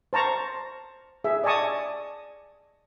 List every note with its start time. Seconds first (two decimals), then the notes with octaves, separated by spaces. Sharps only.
0.13 C5 A5 A#5 C#6
1.24 G#4 E5
1.44 D5 D#5 G#5 A5 C#6 D#6